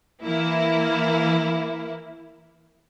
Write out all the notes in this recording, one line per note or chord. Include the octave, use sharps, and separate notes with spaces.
E3 A#3 E4